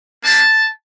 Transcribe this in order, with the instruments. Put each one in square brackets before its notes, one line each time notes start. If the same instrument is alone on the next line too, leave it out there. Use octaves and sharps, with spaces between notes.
[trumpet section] A#3 D4 G4 A5